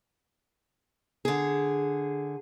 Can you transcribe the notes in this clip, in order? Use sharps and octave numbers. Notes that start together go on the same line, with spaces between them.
D3 G#4